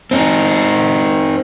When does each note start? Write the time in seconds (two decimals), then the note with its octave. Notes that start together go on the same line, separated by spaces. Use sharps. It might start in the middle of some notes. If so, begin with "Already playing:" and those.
0.11 C4 D#4